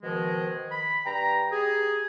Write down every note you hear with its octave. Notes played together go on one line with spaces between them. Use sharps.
B2 D#3 F3 G#3
B5
G2 G5 A#5
G4 G#4